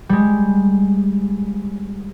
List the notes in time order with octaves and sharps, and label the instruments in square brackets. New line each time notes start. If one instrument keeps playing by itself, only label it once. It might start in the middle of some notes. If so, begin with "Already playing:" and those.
[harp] G3 G#3